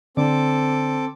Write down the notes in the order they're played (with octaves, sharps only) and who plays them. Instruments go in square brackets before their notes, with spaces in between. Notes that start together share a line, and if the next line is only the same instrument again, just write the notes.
[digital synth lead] D3 [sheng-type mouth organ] C4 A4 D6